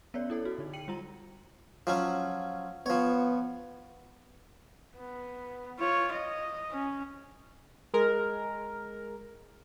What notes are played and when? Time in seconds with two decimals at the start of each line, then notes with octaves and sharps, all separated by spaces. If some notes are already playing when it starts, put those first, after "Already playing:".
0.14 B3 C#4 C#5 D5
0.30 E4 A4 C#5
0.45 F#4
0.58 D3 D#4
0.73 G5 C#7 D#7 F#7
0.88 G3 F4 A#5
1.87 F3 F#3 C#4
2.86 F3 B3 C#5
4.97 B3
5.79 F4 C#5
6.12 D#5
6.72 C#4
7.94 G#3 A#4